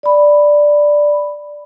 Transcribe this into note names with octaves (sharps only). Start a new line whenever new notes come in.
D5 B5